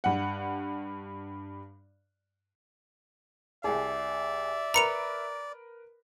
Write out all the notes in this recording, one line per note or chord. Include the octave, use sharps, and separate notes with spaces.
G2 F#5
C2 G#4 D5 E5
A#4 B4 A#5 B5 C#7 F7